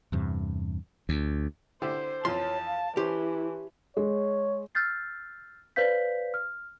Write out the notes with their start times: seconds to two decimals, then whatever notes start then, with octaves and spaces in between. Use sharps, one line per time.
0.12 E2 G2 C3
1.09 D2
1.82 D3 E4 G4 C5
2.25 F2 E3 F3 C#5 A5 C6
2.67 F5
2.97 E3 C#4 E4 G4 C5
3.97 G#3 C#5
4.75 E6 F6 G6 A6 C7
5.76 B4 C5 D5 F5 G6 B6
6.34 F6